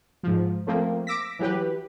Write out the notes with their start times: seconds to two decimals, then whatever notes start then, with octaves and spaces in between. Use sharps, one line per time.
0.23 G#2 F3
0.67 F3 A3 A#3 C4
1.07 D6 E6 A#6 B6
1.39 E3 F#3 G4 B4